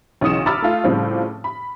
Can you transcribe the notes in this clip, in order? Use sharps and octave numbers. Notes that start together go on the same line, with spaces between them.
B1 C#3 E3 D#6 C#7 E7
A#5 B5 D6 E6 F6 A6
A3 F4
A2 C#3 F3 G3 C4
B5